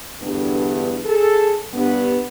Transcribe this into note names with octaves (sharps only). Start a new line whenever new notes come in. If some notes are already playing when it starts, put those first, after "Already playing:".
E2 G2 D3 A3 B3
G#4 A4
G2 B3